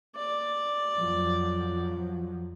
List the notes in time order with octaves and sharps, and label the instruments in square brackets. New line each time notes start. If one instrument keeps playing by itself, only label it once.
[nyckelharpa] D5
[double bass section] F2 F3 F#3